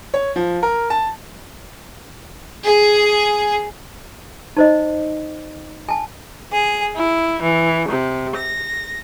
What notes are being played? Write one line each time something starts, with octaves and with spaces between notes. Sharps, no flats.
C#5
F3
A#4
A5
G#4
D#4 C5 D#5
G#5 A5
G#4
E4
E3
C3
A#6